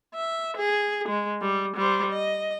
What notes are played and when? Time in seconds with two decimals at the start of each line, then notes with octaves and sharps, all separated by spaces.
0.15 E5
0.57 G#4
1.09 G#3
1.41 G3
1.76 G3 C5
2.12 D#5